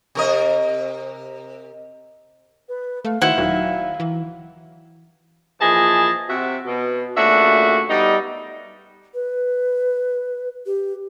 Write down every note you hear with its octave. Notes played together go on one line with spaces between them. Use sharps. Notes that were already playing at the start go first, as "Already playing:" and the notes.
C3 A#4 D#5
B4
A3 F5
D#3 E4 F#4 C5 F#5
D#1 D#3 F#3
E3
A#2 E3 F3 G#4 D#5 A5
C3 F#4 E5
B2
A#2 C#3 A3 D4 F#4 E5
G3 B3 D#4
B4
G4